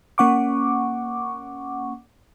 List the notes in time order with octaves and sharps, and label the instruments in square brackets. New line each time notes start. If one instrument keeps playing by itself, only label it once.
[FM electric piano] A#3 C#4 F#5 C#6 D6